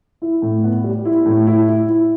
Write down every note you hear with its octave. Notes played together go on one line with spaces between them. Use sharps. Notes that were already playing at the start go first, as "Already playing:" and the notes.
E4
A2
B3
G3
E4
A2
E4
E4
E4